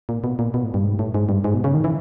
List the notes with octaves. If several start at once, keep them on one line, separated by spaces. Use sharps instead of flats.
A#2
B2
A#2
B2
A2
G2
G#2
A2
G#2
G2
G#2
B2
C#3
D#3
E3